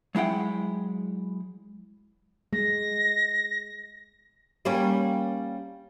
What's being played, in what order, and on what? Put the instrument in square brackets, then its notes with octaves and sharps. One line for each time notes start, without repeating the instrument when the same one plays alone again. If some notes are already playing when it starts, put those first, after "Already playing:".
[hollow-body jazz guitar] F#3 G#3 E4 F#5 G5
[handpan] G#3 [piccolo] A#6
[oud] G3 A#3 C#4